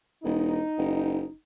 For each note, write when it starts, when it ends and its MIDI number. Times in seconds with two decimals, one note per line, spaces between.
0.24 0.60 28
0.24 1.35 63
0.78 1.26 30